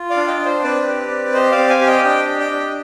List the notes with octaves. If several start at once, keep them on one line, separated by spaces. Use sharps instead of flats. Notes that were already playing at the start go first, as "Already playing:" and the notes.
Already playing: F4
D5 F5
D4
D#5 G5
D4
C5
C4 B4 D5
G4
C4
G4 C5 D#5
D5 F5
C4
F5 G#5
G4
D#5 G5
D4 D#5 G5
G4
D#5 G5
D4